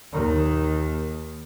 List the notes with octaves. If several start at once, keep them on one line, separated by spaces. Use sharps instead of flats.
D#2 D#3